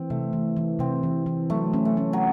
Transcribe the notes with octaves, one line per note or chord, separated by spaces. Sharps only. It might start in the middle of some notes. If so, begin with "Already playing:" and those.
Already playing: E3 C4
C3 A3
E3
E3
C3 C4
E3
E3
F#3 A3
C#4
A3
C#4
F#3